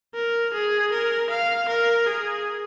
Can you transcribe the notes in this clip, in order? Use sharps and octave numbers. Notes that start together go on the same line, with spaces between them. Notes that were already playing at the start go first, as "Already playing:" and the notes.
A#4
G#4
A#4
F5
A#4
G#4